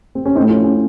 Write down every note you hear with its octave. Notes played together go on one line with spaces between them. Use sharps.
C4
C#4
A2 A3 C4 D#4
C#4 F4
C#4